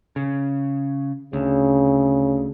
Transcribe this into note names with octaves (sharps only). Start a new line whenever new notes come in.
C#3
D2 C#3